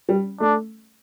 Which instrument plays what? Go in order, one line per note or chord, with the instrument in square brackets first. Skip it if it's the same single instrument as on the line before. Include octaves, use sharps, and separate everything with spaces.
[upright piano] G3
[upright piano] A3 [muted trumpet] D4